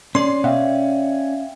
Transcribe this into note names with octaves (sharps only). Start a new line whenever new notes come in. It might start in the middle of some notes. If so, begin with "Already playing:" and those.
C#4 D5 C6
B2 E5 F5 G5